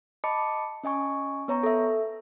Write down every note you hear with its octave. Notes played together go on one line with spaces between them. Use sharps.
D#5 A5 B5 D6 C#7
C#4 D#5 G#5 C#6
B3 C#5 A#5 C#6
A4 E5